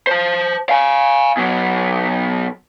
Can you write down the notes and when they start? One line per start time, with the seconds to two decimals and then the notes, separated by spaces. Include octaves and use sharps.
0.07 C5 A5
0.69 F5 G#5
1.37 B2 F#3